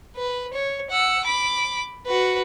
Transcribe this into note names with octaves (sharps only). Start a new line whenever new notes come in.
B4
C#5
F#5 E6
B5 D6
F#4 B4